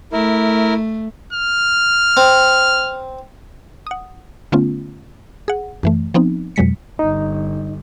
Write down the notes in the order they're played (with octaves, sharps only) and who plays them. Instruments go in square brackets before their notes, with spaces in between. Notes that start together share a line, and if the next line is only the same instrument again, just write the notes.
[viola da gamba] A3 [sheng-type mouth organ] E4 A#4
[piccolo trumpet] F6
[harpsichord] C4
[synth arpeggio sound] F#5 D#6
D3 A3 B3 C#4 F4
G#4 F#5
F#2 E3 A3
F3 B3 C4 D#4
F2 B2 F#3 G#3 B6 C#7
[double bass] G1 [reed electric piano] D#4